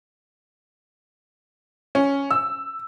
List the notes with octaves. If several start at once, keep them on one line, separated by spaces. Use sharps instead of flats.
C#4
E6